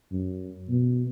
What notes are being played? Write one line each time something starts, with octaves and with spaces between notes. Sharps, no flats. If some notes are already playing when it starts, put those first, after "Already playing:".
F#2
B2